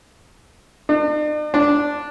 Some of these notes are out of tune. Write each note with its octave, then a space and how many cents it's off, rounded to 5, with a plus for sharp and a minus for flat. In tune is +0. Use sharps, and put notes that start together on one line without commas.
D4 +45
D4 -5